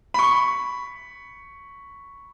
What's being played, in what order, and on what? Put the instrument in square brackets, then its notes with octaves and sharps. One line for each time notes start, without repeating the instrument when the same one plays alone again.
[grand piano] B5 C#6